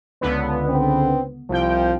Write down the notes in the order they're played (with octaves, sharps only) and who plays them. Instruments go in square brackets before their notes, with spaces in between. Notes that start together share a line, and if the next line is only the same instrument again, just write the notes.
[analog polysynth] C#2 D3 B3
[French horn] C4
[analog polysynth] C2 G5 [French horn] F3